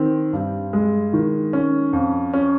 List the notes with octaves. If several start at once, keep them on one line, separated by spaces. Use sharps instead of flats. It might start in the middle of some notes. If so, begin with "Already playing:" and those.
Already playing: D#3 C4
G2
G#3
D#3
C#4
F2
C#4